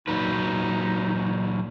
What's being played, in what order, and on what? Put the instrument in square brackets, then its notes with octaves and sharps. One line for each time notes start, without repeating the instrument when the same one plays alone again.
[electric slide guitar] A#2 F#3 B4 [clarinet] D#4